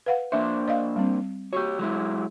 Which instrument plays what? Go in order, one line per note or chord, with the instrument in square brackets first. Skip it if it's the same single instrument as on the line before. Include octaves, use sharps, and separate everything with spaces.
[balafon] B4 F5 F#5
[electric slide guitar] A#3 D4 C5 [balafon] E5
[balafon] D5 D#5 F5
G3 C4
[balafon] F#4 C#6 [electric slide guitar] G4 C#5
[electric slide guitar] F#3 G#3 E4